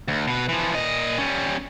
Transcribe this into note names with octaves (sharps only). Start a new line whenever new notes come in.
D2
B2 B4
E3 F3
A#2 D#5
G3 C#4